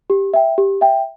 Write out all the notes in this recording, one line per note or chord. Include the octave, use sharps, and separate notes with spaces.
G4
E5 G5
G4
E5 G5